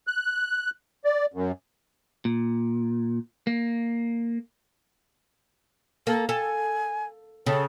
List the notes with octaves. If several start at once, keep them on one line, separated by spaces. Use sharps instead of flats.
F#6
D5
F#2
A#2
A#3
A#3 A4
A4 G#5
C#3 A4